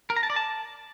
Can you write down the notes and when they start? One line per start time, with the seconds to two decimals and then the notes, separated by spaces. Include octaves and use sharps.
0.10 A#4
0.17 A#5
0.23 A5
0.30 D5
0.36 A5